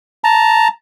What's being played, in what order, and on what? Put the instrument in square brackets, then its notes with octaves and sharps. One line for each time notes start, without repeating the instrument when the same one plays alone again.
[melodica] A5 A#5